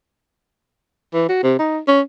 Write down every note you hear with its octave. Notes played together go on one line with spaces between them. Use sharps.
E3
F#4
C3
D#4
C#4